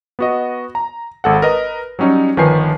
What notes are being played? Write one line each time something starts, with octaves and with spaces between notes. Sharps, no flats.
B3 F#4 D#5
A#5
G#1 A4 F#5
A#4 B4 D#5
F#3 G3 C#4 D#4
G1 D#3 F3 B4 G#5 C7